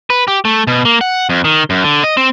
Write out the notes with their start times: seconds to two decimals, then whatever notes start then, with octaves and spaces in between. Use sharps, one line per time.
0.10 B4
0.28 G4
0.45 A3
0.67 B2
0.85 A#3
1.01 F#5
1.29 F2
1.44 D#3
1.70 F#2
1.84 D3
2.04 D#5
2.17 C4